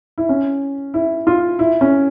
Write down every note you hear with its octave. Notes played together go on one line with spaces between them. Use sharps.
E4
C#4
E4
F4
E4
C#4